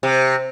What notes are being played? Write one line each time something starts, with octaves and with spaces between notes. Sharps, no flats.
C3